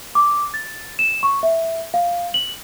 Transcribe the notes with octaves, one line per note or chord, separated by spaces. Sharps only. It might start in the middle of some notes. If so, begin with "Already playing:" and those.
D6
A6
E7
C#6
E5
F5
F#7